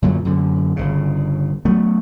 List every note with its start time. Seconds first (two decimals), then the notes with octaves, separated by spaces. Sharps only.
0.02 F#2 A#2 D3 F#3
0.25 F#2 D3
0.76 G1 C#3
1.65 F#3 A3 B3